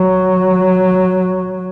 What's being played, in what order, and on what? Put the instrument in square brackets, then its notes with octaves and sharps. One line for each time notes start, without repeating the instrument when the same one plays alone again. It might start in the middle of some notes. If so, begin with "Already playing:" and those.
Already playing: [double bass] F#3